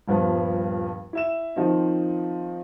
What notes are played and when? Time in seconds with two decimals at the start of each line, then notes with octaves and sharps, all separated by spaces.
0.08 D#1 G2 F3 B3
1.13 E4 E5 E7
1.56 D#3 F3 C4 D#4